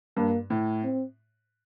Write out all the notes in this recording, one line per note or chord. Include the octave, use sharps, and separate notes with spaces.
G2 A#3
A2
C4